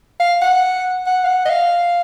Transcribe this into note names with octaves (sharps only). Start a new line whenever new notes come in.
F5
F#5
F#5
F5
F#5
D#5
F5